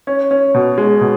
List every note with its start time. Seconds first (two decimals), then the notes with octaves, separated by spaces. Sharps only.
0.07 C#4
0.31 C#4
0.55 B2
0.78 G#3
1.01 B2